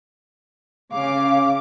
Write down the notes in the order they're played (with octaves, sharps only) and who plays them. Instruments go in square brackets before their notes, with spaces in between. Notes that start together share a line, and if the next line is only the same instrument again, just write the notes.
[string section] C#3 D6 [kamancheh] F5